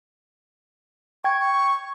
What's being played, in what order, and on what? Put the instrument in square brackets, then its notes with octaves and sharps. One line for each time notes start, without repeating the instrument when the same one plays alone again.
[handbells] G5 G#6 [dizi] C#6
[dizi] C#6